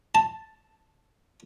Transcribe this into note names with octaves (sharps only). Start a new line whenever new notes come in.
A5